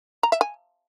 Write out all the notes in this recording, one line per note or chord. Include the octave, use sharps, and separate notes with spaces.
A#5
E5
G#5